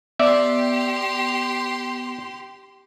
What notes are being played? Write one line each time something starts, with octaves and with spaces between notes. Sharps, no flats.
B3 G4 D5 E5 C6